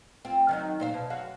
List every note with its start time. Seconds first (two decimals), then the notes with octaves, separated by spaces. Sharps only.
0.25 C4 F4
0.49 D#3 F#3 D#4
0.80 A#2 C5 F5
0.94 B2
1.10 F#2 F#4 F5